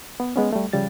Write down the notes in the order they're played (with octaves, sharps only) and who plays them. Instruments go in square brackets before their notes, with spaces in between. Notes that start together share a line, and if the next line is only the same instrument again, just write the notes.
[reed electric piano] B3
G#3 B3 C#4
G3 A3
C#3 F3 G3 A6